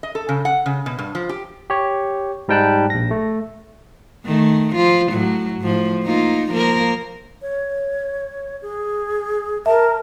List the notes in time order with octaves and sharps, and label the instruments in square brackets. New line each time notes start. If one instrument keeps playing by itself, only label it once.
[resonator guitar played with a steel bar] D#5
A4
C#3
F#5
C#3
B2
G2
F3
G4
[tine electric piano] G4 C#5
G#2 G3 D#4 G5 A5 F#6
A#1 A#6
A3
[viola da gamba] D#3 A3
F3 F4
A2 F#3
A2 F3
A#3 D#4 F4
F3 A#3 A#4
[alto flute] C#5
G#4
[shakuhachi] A#4 [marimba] E5 [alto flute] A5